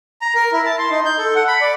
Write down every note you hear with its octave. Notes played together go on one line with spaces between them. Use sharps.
A#5
A#4
E4
A5
C6
D#4
G6
A4
F#5
B5
D5